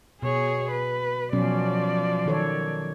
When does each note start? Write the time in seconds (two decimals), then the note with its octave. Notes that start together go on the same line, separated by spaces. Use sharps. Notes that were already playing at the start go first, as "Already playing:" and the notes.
0.22 B2 G#4 C#5
0.71 B4
1.33 B2 F3 F#3 C#4 D5
2.26 D#3 A4 C#5